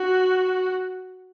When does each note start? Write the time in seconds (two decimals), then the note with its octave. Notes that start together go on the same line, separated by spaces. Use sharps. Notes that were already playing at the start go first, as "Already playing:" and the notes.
Already playing: F#4